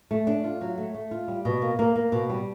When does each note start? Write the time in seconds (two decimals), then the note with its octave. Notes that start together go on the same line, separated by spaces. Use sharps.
0.11 A3
0.27 D4
0.44 F4
0.61 F#3
0.78 A3
0.94 A3
1.11 F4
1.28 G3
1.45 B2
1.62 A#3
1.79 A#3
1.96 A#3
2.12 B2
2.29 G3